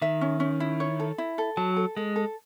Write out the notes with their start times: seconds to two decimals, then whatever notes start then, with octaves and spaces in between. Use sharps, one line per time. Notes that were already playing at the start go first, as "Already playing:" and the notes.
0.02 D#3 E5
0.21 C#4
0.40 C#4
0.60 E4
0.80 C#5
1.00 A4
1.18 E4
1.38 A4
1.57 F#3 A5
1.76 A4
1.97 G#3 A4
2.16 A4